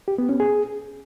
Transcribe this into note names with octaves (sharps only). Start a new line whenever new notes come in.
G4
B3
C#4
G#4